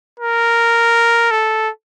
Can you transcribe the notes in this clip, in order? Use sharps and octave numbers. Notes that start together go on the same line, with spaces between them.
A#4
A4